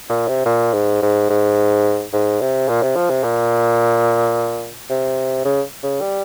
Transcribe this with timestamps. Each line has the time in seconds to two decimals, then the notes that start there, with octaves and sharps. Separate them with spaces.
0.10 A#2
0.28 C3
0.46 A#2
0.73 G#2
1.02 G#2
1.30 G#2
2.13 G#2
2.41 C3
2.69 A#2
2.83 C3
2.96 F3
3.10 C3
3.24 A#2
4.90 C3
5.45 C#3
5.83 C#3
6.01 G3